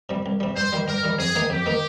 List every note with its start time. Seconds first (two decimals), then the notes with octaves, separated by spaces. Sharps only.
0.09 C3 G3
0.26 C2
0.40 C3 G3
0.56 G2 C5
0.73 D#3 G3
0.88 G2 A#4
1.03 D#3 G3
1.19 F2 G#4
1.35 D#3 A#3 D#4
1.50 F2 G4
1.66 D#3 A#3 D#4